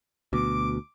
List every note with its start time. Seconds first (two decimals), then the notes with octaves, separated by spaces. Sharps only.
0.33 D2 B2 D6